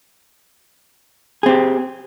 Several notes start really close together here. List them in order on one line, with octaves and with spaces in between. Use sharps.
G#4 C4 G4